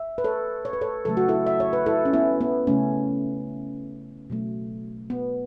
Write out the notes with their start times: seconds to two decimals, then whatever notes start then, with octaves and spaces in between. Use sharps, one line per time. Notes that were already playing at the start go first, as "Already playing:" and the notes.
Already playing: E5
0.18 B4
0.24 A4 C#5
0.65 C#5
0.73 B4
0.81 A4 C#5
1.05 C#3 F#3 A3 A4
1.17 F#4
1.28 E4 A4
1.47 E5
1.60 C#5
1.73 B4
1.86 E4 A4
2.05 C#4
2.13 B3 E4
2.41 B3
2.67 C#3 A3 C#4
4.30 B2 F#3 A3
5.10 B3